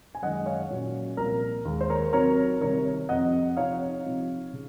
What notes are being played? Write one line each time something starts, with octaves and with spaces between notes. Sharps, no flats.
G#5
F#2 D#3 G#3 D#5 F#5
C#5 F5
A#2 F#3 C#4
C2 A#2 F3 A#3 A#4
D#2 D#3 G#3
C5
A#4 C#5
C3 F#3 C4 D#4 A#4 C#5
C2 C3 D#3 A#4 C#5
F2 C3 F3 D#5 F#5
C3 F3 C4 D#4 C#5 F5
C3 F3 C4 D#4
C#3